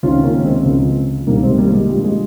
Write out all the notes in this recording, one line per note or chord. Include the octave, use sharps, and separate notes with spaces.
C#2 C3 D#3 C#4 F4
A#3 C#4
C#4
G#3 C4
C#2 C#3 F3
C2 C3 D#3 G3 A#3
G#3 C4
G3 A#3
G#3
G2 F3 G3
G#3